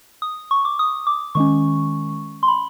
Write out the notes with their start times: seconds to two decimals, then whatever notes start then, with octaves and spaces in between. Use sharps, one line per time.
0.22 D#6
0.51 C#6
0.65 D6
0.79 D#6
1.07 D6
1.35 D#3 G#3 C#4 C#6
2.43 C6
2.48 B5